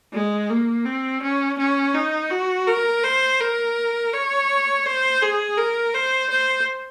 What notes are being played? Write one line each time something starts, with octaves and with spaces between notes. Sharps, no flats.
G#3
A#3
C4
C#4
C#4
D#4
F#4
A#4
C5
A#4
C#5
C5
G#4
A#4
C5
C5